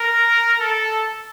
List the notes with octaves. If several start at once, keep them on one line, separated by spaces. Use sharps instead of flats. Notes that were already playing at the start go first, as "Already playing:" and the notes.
Already playing: A#4
A4